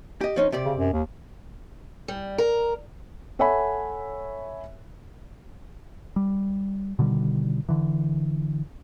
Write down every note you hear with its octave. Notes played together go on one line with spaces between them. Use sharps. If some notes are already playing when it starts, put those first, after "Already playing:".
G4 D#5
F3 C#4 D#4
C3 G4 D5
C#3
F#2
D#2
G3
A#4
A4 C#5 E5 F#5 G#5 B5
G3
B2 D3 D#3 G3
D3 E3